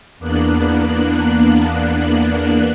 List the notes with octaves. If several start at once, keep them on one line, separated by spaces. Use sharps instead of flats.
E2 A#3 B3 D4 F#6